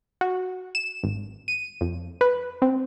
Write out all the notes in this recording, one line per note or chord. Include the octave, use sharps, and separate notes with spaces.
F#4
E7
G#1
D#7
F2
B4
C4